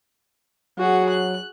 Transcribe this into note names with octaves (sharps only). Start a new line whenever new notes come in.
F#3 F#4 G#4 F#5
F#6